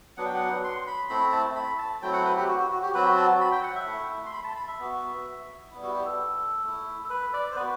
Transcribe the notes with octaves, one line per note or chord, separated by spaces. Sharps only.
F#3 B3 D4 F#5
G5
F#5
C6
B5
A3 C4 E4 B5
A5
B5
A5
F#3 A3 C4 E4 G5
F#5
B4
G4
F#4
F#4
F#4
G4
F#3 C4 F#4 B4
A5
B5
G5
F#5
E5
A3 E4
C6
B5
A5
B5
E5
B3 F#4
G3 B3 E4
F#4
G4
A4
A3 E4
A4
B4
D5
C5
B3 F#4 B4